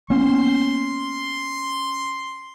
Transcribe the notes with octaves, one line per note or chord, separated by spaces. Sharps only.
A#3 B3 C#4 C6